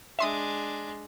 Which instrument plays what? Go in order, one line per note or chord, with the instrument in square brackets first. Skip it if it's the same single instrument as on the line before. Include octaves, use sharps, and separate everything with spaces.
[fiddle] G#3 D4 [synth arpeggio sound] E5 C6 D#6